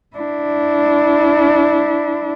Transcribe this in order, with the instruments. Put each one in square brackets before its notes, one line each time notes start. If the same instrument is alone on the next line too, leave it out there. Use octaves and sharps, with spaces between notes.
[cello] D4 E4